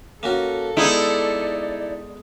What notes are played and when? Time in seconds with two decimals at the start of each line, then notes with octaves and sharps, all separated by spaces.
0.23 A#3 C#4 F#4 A4
0.77 G#3 B3 D#4 E4 D5